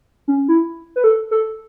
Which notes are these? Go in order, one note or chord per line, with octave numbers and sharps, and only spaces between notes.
C#4
E4
B4
A4
A4